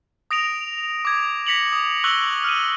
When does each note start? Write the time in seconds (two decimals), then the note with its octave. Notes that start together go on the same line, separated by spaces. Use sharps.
0.31 D#6 A#6 D7 F7
1.05 D6 G#6
1.47 A#6 B6 C#7 F7 F#7
1.73 D#6
2.04 C#6 E6 F#6 F#7 G7
2.44 F6 D#7